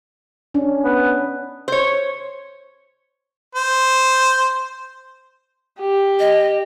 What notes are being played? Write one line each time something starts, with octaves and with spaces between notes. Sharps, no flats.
C#4 D4
B3
C5 C#5
C5
G4
D#5